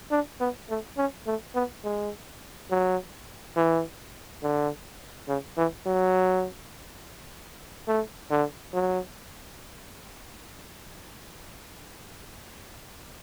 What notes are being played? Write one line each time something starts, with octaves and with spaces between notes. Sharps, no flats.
D4
B3
A3
C#4
A3
B3
G#3
F#3
E3
D3
C#3
E3
F#3
A3
D3
F#3